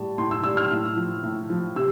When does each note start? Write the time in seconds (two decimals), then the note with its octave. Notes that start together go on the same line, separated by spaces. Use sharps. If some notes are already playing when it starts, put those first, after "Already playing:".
Already playing: A2 G3 A5
0.18 A2 C6
0.31 E6
0.44 G3 E6
0.57 F6
0.71 A2
0.97 F3
1.24 A2
1.50 F3
1.76 C3 E6